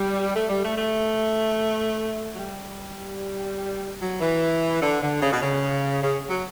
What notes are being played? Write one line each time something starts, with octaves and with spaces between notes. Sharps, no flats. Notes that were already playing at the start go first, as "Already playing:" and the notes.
Already playing: G3
A3
G3
A3
A3
F#3
G3
F#3
E3
D3
D3
C#3
B2
C#3
C#3
F#3